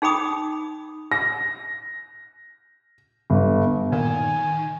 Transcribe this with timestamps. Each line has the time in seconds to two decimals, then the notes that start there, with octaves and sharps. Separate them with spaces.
0.02 D#4 G#4 G5 B5 D6 D#6
1.12 A#6
3.30 G1
3.92 A#2 D#3 G#5